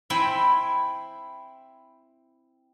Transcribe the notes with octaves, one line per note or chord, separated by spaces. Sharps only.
C4 E4 G5 G#5 B5